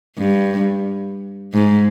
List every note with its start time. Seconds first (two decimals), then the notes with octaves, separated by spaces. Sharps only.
0.18 G2
1.54 G#2